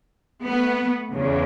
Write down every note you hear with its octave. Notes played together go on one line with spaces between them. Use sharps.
A3 B3
E2 C#3